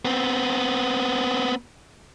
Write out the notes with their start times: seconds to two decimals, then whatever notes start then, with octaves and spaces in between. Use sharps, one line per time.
0.05 B3 C4